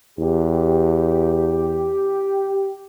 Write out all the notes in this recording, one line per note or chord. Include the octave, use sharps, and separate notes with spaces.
E2 G4